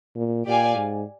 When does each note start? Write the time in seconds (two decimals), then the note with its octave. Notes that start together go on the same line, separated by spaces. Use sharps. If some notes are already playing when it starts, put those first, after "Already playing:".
0.16 A#2
0.46 A#2 G4 D5 F5 G#5
0.76 G#2